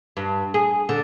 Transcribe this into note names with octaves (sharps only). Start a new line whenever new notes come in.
G2
G#4
D3